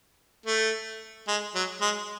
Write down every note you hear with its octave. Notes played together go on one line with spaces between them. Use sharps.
A3
G#3
F#3
G#3